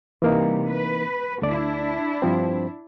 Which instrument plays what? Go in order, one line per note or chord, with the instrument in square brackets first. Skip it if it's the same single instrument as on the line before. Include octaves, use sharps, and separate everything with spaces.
[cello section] C3 G3 [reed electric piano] E3 A#3 D#4
[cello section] B4
[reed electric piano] D2 A3 D5 [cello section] D4 E4
[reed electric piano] G2 F3 C4